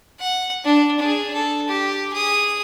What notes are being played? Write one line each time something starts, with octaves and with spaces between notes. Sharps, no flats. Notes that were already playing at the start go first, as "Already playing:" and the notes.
F#5
D4
D4 G#4
A4
G4
G#4 D#6